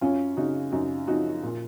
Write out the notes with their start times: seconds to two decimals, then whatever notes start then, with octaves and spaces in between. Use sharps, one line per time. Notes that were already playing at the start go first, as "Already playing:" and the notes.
0.01 F#2 C#4 F4
0.37 C#3 D#4 F#4
0.72 F#2 D#4 F#4
1.07 F3 D#4 F#4
1.43 A#2